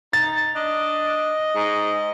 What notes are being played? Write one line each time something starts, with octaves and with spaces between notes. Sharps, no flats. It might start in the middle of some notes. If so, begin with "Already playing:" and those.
D#4 A6
D4 D#5
G#2